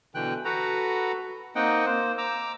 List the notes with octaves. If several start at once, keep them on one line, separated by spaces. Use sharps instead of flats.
B2 D3 E3 G5 F#6
F#4 A4 B4 F#5 A#5
A#3 C4 D#4 D#5 F#5 G5
A#3 C5
A#5 D6 E6